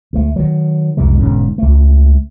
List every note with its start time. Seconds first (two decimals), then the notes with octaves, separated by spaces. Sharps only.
0.13 D2 A3
0.36 D#3 F#3
0.97 C2 F2 C#3 G#3
1.19 E1 G#2 D3 C#4
1.58 C#2 A3